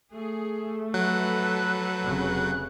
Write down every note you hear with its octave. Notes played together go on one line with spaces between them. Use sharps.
A3 G#4
F3 F#3 A4 B4 F#6
F1 C#3